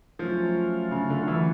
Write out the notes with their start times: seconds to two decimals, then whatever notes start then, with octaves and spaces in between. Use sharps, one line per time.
0.19 F3 F#3 A3 C#4 F4
0.91 C#3
1.10 D3
1.28 E3